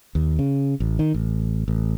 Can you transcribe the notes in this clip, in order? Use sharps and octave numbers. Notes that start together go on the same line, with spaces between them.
D#2
C#3
A1
D#3
A1
A1